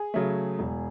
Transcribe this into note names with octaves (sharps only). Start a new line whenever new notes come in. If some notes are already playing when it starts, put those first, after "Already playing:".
Already playing: G#4
C#3 F#3 A3
E1